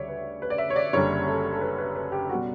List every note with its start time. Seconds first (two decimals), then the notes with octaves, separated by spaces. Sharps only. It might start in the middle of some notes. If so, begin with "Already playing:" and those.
Already playing: D2 C#3 G3 C#5 D5 E5
0.08 B4
0.42 B4
0.50 D5
0.58 E5
0.70 C#5
0.76 D5
0.93 F#1 F#2 D3 G3 C#5
1.28 A4
1.52 A4
1.61 B4
1.78 B4
1.95 B4
2.12 G4
2.30 B2 G3 F#4